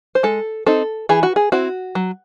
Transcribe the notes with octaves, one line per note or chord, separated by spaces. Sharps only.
C5
G#3 A4
C4 D#4 A4
E3 G#4
F#4
G#4
C4 E4 F#4
F#3